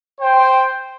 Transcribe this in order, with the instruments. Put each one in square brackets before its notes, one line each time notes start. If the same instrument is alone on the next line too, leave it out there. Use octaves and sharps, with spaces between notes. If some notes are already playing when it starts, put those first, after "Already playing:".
[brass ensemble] C5 G5